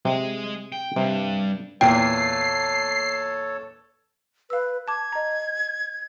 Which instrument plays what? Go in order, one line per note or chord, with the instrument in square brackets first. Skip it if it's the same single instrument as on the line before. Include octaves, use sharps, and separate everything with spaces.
[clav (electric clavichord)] C3 [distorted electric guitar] G#3 D#5
[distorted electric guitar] G5
[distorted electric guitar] G2 [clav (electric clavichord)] C3
[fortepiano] E2 A#2 [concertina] A4 C#5 A5 [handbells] G5 [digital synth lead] C7
[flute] B4 [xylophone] F5 E6
[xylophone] A5 D6 [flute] G#6
[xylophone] D#5 A#5